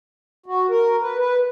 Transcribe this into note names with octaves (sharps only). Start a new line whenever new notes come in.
F#4
A#4
B4
B4